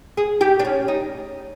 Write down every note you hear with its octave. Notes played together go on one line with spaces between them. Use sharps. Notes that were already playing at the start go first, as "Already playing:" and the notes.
G#4
G4
D4
C#4
D#4